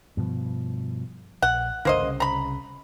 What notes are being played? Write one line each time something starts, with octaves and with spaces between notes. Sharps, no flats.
G2 B2 F3
A#1 F#5
G1 C#2 D3 A#3 C5 D#5
C2 C#3
A#5 B5